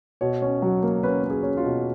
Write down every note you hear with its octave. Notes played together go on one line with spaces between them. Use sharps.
B2 C#5
C#4
F#3
A#3
C#4 B4
C#4
G#4
C#4
F4
B2